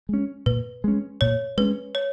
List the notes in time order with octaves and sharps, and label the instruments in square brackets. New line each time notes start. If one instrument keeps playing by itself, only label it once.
[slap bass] G#3 C#4
[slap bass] A#2 [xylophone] B4
[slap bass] G#3 C#4
[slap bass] A#2 [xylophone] C#5
[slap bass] G#3 C#4 [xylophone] B4
[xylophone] C#5